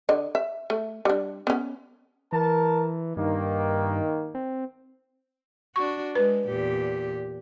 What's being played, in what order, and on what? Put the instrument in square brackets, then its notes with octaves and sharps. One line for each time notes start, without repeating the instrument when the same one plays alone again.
[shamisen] D3 D#5
E5
A3
G3 D4
B3 C#4
[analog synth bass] E3 [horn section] A#4 A5
[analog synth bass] G2 [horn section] D#3 A#3
[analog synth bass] C4
[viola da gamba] D4 F#4 [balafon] C#6
[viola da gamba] G#3 [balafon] B4
[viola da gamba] E2 A#2 G4